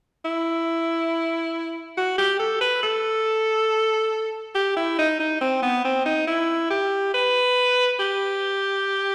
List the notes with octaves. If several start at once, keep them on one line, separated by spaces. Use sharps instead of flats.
E4
F#4
G4
A4
B4
A4
G4
E4
D#4
D#4
C4
B3
C4
D#4
E4
G4
B4
G4